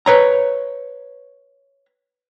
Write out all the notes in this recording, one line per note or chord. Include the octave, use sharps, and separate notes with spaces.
B4 C#5 A#5